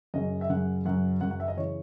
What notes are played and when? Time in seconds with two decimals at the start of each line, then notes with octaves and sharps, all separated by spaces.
0.14 F#2 C#3 F#3 D#5
0.41 E5
0.49 F#2 C#3 F#3 F#5
0.85 F#2 C#3 F#3 F#5
1.21 F#2 C#3 F#3 F#5
1.31 F#5
1.40 E5
1.48 D#5
1.57 C#3 E3 C#5